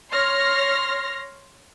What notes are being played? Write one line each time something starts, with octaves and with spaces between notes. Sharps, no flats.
C#5 C6 F6 A#6